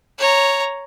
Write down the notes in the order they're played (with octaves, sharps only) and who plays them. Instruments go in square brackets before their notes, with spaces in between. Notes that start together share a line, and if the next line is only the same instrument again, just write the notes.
[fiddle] C#5 A#5